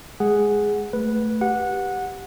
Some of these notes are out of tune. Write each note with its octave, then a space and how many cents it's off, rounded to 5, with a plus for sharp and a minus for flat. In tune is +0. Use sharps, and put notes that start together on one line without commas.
G#3 +5 G#4 +0 F#5 +0
A3 +0 B4 -10
G4 +0 F#5 -15